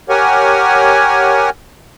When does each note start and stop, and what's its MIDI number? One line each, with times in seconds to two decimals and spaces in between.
0.09 1.50 67
0.09 1.50 70
0.09 1.50 73
0.09 1.50 78
0.09 1.50 80